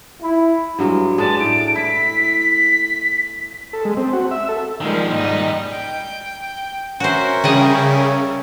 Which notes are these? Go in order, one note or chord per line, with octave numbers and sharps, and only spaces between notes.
E4
G2 F#3 G#3
G#3 B4 D5 A5
A2 D7
E4 B6
A4
G#3
C4
F#4
E5
A4
D#3 F3 G3 G#3 A#4
G#2 D#4 D#5
G5
C#4 F#4 A#4 C5 E5
C#3 G3 D5 D#5